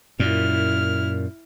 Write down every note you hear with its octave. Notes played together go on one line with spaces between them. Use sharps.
F#2 A#2 E4 F6